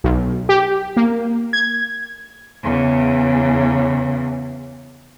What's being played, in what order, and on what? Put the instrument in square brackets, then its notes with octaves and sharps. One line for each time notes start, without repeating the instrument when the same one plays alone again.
[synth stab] B1
G4
A#3
G#6
[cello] E2 C#3